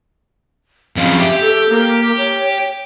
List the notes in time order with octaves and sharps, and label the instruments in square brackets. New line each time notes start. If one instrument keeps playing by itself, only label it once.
[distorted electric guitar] F2 C#3 [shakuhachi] F5
[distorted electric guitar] G4 [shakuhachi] E5
[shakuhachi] A4
A#3
C#5